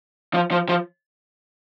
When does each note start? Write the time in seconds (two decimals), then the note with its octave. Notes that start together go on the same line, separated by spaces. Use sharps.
0.34 F3
0.51 F3
0.69 F3